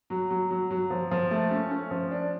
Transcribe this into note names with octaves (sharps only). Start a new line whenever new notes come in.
F#3
F#3
F#3
F#3
F3
F3
A3
C#4
C#4
F3
D4